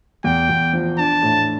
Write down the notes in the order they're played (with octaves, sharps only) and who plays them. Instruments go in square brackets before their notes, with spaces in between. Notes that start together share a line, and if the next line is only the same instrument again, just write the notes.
[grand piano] E2 [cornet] G5
[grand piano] E2
F3
[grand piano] D4 [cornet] A5
[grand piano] A2